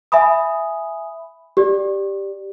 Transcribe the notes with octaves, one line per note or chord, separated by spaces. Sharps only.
E5 G#5 B5 D#6
G4 D5